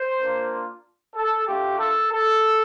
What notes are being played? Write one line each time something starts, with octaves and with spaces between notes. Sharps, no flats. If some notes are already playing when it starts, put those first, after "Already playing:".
Already playing: C5
A#3 D4 F4
A4
A3 D4 F4 G4
A4
A4